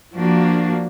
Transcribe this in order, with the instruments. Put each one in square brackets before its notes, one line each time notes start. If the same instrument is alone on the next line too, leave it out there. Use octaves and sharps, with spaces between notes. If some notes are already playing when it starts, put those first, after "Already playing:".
[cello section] F3 A#3 D4 F#4